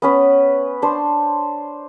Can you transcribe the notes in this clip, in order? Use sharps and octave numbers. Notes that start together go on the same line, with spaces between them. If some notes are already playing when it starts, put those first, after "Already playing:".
B3 C#4 B4
D4 C5